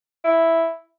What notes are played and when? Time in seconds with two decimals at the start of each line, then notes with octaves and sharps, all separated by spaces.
0.24 E4